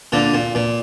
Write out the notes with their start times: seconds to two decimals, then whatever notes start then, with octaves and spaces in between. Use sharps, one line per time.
0.12 A#2 D3
0.34 A#2
0.55 A#2